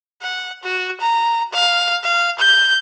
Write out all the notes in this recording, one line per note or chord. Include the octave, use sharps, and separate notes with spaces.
F#5
F#4
A#5
F5
F5
G6